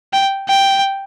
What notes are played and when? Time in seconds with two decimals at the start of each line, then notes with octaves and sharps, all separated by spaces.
0.13 G5
0.49 G5